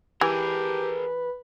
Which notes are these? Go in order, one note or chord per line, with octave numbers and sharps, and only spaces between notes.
E3 G4 G#4 A#4 B4